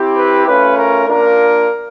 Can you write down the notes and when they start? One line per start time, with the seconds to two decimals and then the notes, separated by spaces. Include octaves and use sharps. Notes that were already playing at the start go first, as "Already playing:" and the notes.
Already playing: C4 E4 G4
0.16 B4
0.46 A3 C#4 F4 B4
0.77 A#4
1.08 A#3 D4 F4 A#4